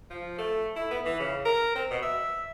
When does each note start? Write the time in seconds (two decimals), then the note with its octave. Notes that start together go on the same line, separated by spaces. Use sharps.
0.10 F3
0.38 A3
0.76 E4
0.91 B3
1.06 E3
1.20 C#3
1.45 A#4
1.75 C4
1.91 B2
2.03 E5